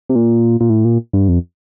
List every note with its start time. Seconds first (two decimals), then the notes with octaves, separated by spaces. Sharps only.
0.09 C3
0.15 A#2
0.61 A#2
0.70 A2
0.85 A#2
1.13 G2
1.28 F2